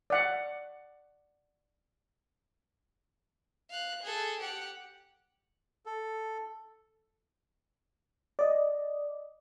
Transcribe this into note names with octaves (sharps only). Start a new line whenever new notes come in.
D5 F#5
F5 F#6
G#4 A4
G4 F#5
A4
D5 D#5